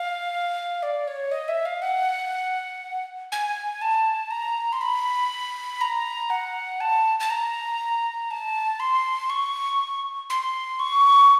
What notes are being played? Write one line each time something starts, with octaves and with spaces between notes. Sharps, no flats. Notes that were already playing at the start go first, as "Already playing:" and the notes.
Already playing: F5
D5
C#5
D#5
E5
F5
F#5
G#5
A5
A#5
C6
B5
A#5
F#5
A5
A5
A#5
A5
C6
C#6
C6
C#6